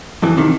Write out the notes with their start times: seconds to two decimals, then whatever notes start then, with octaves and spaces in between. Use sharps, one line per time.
0.23 F2 E3
0.37 C3 D#3